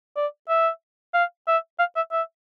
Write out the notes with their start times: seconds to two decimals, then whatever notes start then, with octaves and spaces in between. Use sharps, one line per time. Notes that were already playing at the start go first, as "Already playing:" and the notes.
0.17 D5
0.49 E5
1.14 F5
1.47 E5
1.79 F5
1.96 E5
2.12 E5